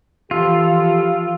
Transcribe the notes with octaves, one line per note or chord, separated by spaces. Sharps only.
E3 F3 F4 G4 A4